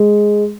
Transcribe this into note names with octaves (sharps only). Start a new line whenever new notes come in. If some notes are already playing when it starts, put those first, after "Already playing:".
Already playing: G#3